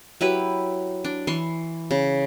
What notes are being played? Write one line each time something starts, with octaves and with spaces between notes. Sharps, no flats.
F#3 E4 G4 B4
D4
E3 C6 C#6
C#3